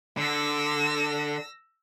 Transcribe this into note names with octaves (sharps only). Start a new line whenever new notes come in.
D3 E6 A#6